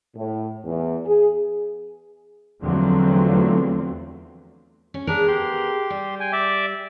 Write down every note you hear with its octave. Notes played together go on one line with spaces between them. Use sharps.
A2
E2
G#4
E2 D3 F3 F#3 A3 C4
C#4
B3 D4 G#4 A#4
G4 C6
G3
G5 G#5
D5 E5 D6